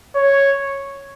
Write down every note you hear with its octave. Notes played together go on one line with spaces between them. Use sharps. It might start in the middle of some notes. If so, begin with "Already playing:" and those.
C#5